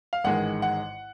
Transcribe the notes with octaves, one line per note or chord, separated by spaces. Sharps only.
F5
A1 G#2 D#3 G#3 F#5
F#5